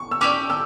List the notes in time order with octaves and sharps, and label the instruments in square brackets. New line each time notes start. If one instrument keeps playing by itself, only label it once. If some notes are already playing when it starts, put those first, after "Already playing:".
Already playing: [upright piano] C#6
E6
[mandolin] C#4 G4 D5 [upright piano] D6
[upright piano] E6